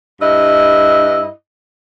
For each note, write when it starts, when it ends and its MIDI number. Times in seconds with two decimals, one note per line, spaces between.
0.21 1.28 43
0.21 1.28 64
0.21 1.28 75